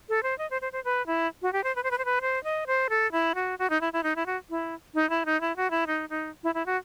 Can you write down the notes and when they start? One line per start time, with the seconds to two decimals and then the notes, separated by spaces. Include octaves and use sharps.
0.09 A4
0.23 C5
0.38 D#5
0.50 C5
0.62 C5
0.72 C5
0.85 B4
1.07 E4
1.42 F#4
1.53 G4
1.64 C5
1.76 B4
1.83 C5
1.91 B4
1.98 C5
2.05 B4
2.21 C5
2.44 D#5
2.67 C5
2.90 A4
3.12 E4
3.35 F#4
3.59 F#4
3.70 D#4
3.81 E4
3.93 E4
4.03 D#4
4.16 E4
4.26 F#4
4.50 E4
4.95 D#4
5.10 E4
5.26 D#4
5.41 E4
5.56 F#4
5.71 E4
5.87 D#4
6.09 D#4
6.44 E4
6.55 E4
6.66 F#4